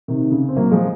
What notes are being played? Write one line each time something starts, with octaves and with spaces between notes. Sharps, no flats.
C3 D#3
C#3
C4
F#3 A#3
F3 G#3